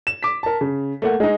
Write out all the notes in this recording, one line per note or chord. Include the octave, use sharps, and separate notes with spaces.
E7
D6 B6
A#4 A5
C#3
A3 A#3 F#5
G#3 D#4